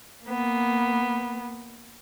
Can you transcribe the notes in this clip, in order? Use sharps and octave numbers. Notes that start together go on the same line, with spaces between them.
A#3 B3